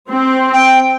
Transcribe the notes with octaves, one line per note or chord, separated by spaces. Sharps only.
C4
G5